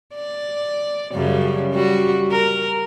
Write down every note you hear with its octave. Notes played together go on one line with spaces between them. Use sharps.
D5
F#2 C#3 G3
G3 F#4
A#4